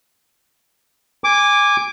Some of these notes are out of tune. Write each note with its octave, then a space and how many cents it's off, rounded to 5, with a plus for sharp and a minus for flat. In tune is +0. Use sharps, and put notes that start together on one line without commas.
G#5 -20 D6 +0